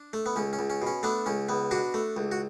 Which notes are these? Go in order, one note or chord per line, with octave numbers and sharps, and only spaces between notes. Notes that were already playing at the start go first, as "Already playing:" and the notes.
Already playing: D4
A3
B3
C#2 C#4
C#4
C#2
C#4
B2 C#4
A3 B3 D4
C#2 C#4
C#2 B3
B2 D4 F#4
A3
C#2
F#4